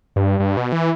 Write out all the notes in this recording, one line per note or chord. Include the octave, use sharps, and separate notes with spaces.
G2
G2
B2
E3